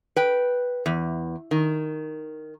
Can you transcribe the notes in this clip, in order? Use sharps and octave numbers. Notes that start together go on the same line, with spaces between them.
B4 G5
E2
D#3